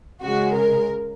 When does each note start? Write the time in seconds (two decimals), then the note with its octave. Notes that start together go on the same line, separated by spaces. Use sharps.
0.23 C#3 G#3 F#4
0.56 A#4